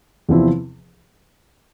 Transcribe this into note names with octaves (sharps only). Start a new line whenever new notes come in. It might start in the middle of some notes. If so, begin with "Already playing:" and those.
E2 C3 F3 C4 E4